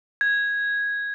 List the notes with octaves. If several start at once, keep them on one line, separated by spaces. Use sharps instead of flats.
G#6